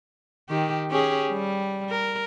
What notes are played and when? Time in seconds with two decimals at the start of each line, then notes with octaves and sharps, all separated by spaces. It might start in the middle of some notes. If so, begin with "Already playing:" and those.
0.49 D#3 G4
0.90 C#4 G4 G#4
1.31 G3
1.90 A#4